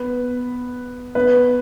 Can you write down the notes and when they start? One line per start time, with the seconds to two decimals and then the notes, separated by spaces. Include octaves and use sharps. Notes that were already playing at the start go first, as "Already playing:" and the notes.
Already playing: B3 B4
1.15 B3 B4